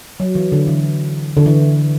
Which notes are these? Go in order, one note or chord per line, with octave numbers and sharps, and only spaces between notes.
F#3
E3
D3
E3
D3
E3